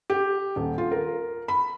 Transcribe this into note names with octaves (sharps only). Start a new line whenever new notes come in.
G4
D#1
F4
A#4
B5